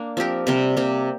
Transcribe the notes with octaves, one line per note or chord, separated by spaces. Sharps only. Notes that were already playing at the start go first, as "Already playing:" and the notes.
Already playing: A#3 D4
F3 C4 G4 A#4
C3 G3 C4 A#4
C3 A#3 G4